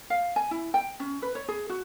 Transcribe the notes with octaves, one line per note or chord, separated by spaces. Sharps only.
F5
G#5
E4
G5
C#4
B4
C#5
G#4
F#4